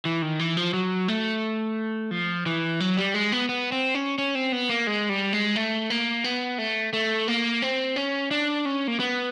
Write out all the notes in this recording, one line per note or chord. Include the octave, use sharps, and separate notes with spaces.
E3
D#3
E3
F3
F#3
A3
F3
E3
F#3
G3
G#3
B3
B3
C4
C#4
C#4
C4
B3
A#3
G#3
G3
G#3
A3
A#3
B3
A3
A3
A#3
C4
C#4
D4
C#4
A#3
B3